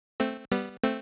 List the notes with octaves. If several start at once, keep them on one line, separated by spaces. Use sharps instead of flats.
A3 C4
G3 B3
A3 C4